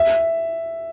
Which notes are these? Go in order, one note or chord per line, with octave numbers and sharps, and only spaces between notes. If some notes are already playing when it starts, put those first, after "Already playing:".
Already playing: E5